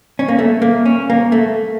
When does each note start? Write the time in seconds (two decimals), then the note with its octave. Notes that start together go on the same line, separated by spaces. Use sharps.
0.19 C#4
0.28 A#3
0.39 A3
0.62 A#3
0.85 C#4
1.10 A#3
1.32 A3